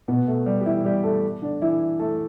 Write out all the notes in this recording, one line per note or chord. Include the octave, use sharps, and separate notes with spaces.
B2 B3
A3
G3
G4
E3 E4
G3 G4
A3 A4
D3 D4
E3 E4
A3 A4